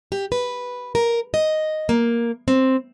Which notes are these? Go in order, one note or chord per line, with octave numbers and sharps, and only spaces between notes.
G4
B4
A#4
D#5
A#3
C4